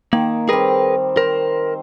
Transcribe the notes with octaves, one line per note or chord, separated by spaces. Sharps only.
D#3 A#3
G3 C4 G#4 A#4 B4
A#4 C5